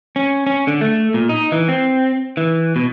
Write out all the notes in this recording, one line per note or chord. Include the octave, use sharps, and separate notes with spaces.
C#4
C#4
D3
A3
A#2
D#4
E3
C4
E3
B2